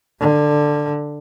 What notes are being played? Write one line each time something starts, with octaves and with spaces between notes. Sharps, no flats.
D3